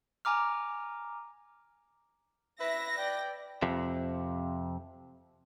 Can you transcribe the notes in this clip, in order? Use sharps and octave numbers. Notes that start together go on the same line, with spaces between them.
G#5 A#5 D6 F6
E4 B4 E5 A#6
D5 G5
F2 C3